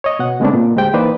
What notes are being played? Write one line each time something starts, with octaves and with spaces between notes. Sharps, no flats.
C#5 D#5
B2 F#5
C#3 G#3 A3 B3 C4 D4
A#2
D2 G#3 G4 C5 G5
E3 A#3 D#4 B4 C5 D5